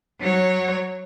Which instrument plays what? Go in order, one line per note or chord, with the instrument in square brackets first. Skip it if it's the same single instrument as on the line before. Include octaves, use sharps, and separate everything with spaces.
[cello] F#3 C#5